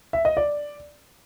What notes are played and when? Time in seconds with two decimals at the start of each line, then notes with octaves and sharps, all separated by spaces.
0.13 E5
0.25 D#5
0.37 D5